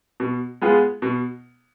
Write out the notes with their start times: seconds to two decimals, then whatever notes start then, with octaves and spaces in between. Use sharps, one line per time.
0.20 B2
0.62 G#3 B3 F4 G#4
1.02 B2